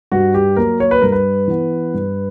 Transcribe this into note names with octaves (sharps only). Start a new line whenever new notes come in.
G2 F#4
G4
F#3 A#3 A#4
C#5
B4
G2 A#4
B4
E3 B3
G2